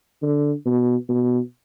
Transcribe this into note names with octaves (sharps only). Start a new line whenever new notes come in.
D3
B2
B2